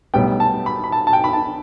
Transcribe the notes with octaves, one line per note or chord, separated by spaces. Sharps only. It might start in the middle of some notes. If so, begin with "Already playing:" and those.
B1 A2 G3 B3 G5
A5
B5
B5
A5
A5
G5
B5
A5